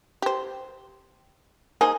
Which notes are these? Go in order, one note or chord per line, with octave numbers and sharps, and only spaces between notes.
G4 C5
A#3 D#4 G#4 C5